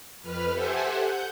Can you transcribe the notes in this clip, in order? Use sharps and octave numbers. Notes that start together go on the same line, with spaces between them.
F2 B4 F6
G4 A4 C5 E5 F#5 G#5
F#5 G6